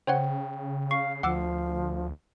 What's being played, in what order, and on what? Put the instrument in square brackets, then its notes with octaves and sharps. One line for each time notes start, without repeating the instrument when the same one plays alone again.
[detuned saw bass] C#3 [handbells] C5 C#5 F#5 [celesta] G5
[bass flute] F5 [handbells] C#6 [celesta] C7
[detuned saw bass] D2 [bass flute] F3 [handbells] F#5 D6 E6